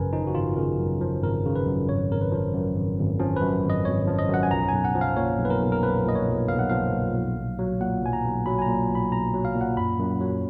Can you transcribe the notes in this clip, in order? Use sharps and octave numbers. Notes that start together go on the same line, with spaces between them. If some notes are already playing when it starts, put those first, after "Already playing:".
Already playing: G#1 F#2 C#3 F3 A#4 B4 G#5
F3 D#4
F#4
G#1 F4
C#3 A#4
F#2
F3
G#1 A#4
C#3
B4
F#2
G#1 C#5
G#1 A#4
B4
F3
F#2
G#1
G#1
F3 C#4
B4
F#2
G#1
D#5
G#1 C#5
F3
D#5
F#2 F#5
G#5
B1 A#5
G#5
B1
F#5
F3
F5
A#2 C#5
B1
B4
A#4
B1
A#4
F3 B4
A#2 D#5
C#5
B1
B1 F5
F#5
F3 F5
A#2
B1
B1
F#3
A#2 F#5
B1 G#5
A#5
B1
F#3 B5
G#5
A#5
A#2
B1
B5
B1 A#5
F#3
F5
A#2
F#5
F#2 B5
F#2
F#3